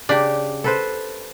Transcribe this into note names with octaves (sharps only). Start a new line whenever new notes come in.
C#3 D4 G4
A4 B4 C5